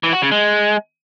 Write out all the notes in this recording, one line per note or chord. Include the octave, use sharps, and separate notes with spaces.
E3
F#4
C#3
G#3